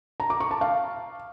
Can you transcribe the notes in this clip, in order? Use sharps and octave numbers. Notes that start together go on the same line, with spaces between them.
A#5
D6
C#6
A5
F5